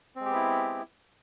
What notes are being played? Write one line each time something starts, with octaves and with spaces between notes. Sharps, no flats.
G#3 B3 C4 E4 G4